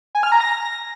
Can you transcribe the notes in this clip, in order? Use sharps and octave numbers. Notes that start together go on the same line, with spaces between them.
G#5
F6
A#5
A#6